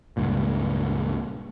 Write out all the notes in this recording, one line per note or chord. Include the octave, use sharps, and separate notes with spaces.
C#2 G2 A#2